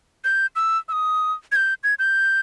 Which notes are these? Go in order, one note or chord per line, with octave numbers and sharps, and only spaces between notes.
G6
E6
E6
D#6
G#6
G6
G#6
G6